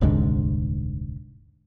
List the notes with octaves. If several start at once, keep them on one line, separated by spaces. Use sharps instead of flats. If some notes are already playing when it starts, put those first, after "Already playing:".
D#1 C2 G#2 D3